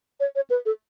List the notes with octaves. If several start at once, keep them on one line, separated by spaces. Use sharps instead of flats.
C#5
C#5
B4
A4